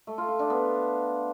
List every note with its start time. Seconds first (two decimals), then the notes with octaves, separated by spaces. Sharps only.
0.07 A3
0.18 F4
0.29 F4
0.39 D4
0.50 B3